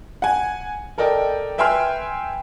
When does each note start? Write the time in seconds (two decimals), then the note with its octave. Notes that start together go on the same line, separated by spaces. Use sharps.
0.22 F#5 G#5
0.98 A4 A#4 D5 D#5 G5
1.58 B4 E5 G5 G#5 C6 F6